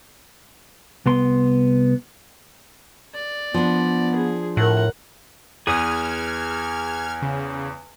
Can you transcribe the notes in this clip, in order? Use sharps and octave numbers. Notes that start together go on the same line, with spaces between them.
C2 B3 C6
D5
F3 B3 D4
G#4
A2 A#4 F#5
E2 G#4 B4 D#6 F6 G#6
C#3